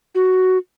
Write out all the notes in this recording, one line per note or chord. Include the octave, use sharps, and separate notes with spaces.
F#4